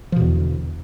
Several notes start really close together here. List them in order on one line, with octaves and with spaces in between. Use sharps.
F3 B2 E2 D3